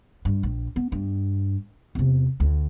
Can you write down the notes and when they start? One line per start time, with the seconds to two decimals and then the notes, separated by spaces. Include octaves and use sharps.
0.25 G2
0.43 A#1
0.76 B3
0.92 G2
1.95 E2 C3
2.40 D2